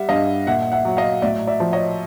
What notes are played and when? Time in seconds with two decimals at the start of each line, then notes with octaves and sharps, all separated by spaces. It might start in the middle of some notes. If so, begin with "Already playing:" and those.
Already playing: G3 E5 F#5
0.09 G2 D#5 F5
0.47 A#2 E5 F#5
0.72 E5 F#5
0.85 F#3
0.97 D#5 F5
1.22 A2 D5 E5
1.47 D5 E5
1.60 F3
1.73 C#5 D#5